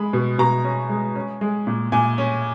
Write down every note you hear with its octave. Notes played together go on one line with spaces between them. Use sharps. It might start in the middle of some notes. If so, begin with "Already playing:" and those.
Already playing: G#3 B5
B2
B2 A#5
C#4
G#3
C#4
G#3
A#2
A#2 G#5
C#4